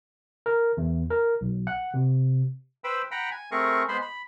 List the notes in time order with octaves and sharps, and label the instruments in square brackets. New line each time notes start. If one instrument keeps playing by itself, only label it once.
[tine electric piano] A#4
E2
A#4
B1
F#5
C3
[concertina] B4 C5 G5 B5 E6
F#5 G5 A#5 B5
G#5
A3 C4 G#4 A#4 C#6
G#3 B3 C5 B5 C6
B5